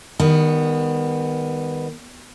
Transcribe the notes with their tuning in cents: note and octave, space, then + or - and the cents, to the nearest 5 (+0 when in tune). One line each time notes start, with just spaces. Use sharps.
D#3 +0 G3 +40 B3 +0